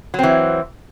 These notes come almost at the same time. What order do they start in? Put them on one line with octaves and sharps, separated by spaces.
F#3 C4 E3